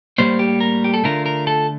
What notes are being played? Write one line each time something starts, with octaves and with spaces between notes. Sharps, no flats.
A2 G3 A#3 C5
G4
A#4
G4
A4
D3 A3 D4 F4 A#4
A#4
A4